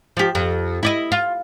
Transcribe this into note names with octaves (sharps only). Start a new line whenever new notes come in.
F3 G4
F2
E4 D5 D#5
F4